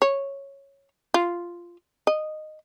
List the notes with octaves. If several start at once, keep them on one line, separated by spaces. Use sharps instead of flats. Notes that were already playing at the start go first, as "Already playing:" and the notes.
C#5
F4
D#5